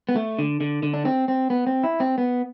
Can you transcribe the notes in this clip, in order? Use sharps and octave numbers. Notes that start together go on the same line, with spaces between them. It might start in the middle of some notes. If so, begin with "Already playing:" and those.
B3
A3
D3
D3
D3
D4
C4
C4
B3
C4
E4
C4
B3